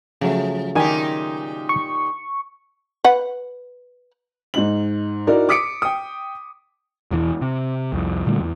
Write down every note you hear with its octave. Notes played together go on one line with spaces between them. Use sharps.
C#3 F3 F#3 A3
A#2 D#3 D#4 G4 G#5
C#6
B4 F#5
G#2 D#4 F#7
D#4 E4 F#4 A#4 D5
D6 D#6 B6 C#7 D7
G5 D#6
E1 E2 E3
C3
C2 F2
A#2 D3 G3 A3
E2